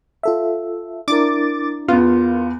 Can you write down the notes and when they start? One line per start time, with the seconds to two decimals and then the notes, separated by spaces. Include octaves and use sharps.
0.23 F4 A4 E5
1.08 D4 E4 A#4 D6 A6
1.88 E2 B3 F4